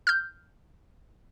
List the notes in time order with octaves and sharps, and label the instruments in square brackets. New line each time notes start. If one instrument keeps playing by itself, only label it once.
[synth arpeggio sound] F6 G6